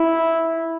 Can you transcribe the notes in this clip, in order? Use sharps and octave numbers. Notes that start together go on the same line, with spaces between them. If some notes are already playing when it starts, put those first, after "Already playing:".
Already playing: E4